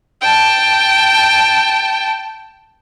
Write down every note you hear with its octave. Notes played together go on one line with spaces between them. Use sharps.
G5 A5